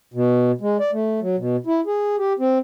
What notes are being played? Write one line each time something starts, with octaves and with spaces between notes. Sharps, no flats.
B2
G#3
D5
A3
F#3
B2
E4
G#4
G4
C4